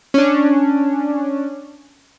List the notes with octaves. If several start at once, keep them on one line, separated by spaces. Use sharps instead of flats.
C#4 D4